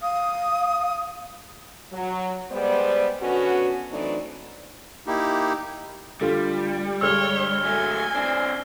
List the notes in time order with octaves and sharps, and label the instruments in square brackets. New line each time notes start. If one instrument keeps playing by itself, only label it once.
[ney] F5 [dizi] D#6
[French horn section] F#3
G3 G#3 B3 C5 D5
D3 B3 C#4 F#4
E3 F#3 A3 C4 D4 D#4
[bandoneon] A#3 D#4 E4 G4
[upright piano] D3 A3 F4 [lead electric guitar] G3
[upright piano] G2 D3 G#3 [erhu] C#5 [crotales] E6 F6 G7
[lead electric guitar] F#3 A3 [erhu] G#5
[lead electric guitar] C4 D4